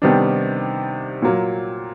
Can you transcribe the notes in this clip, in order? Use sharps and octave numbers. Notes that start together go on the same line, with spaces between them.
C3 D#3 G3 B3 D4
A#2 F#3 A#3